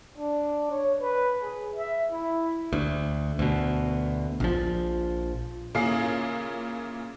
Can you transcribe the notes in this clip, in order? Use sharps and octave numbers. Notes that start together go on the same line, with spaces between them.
D4
C#5
B4
G#4
E5
E4
D2
D2 B2
A#1 F3
A#2 C#3 A#3 E4 G#4 C7